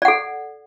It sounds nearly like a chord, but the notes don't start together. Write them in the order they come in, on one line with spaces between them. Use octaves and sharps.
D5 F#5 A4